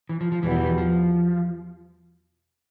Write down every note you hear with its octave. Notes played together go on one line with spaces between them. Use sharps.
E3
F3
F3
E2 B2 E3 G3 B3
E3
F3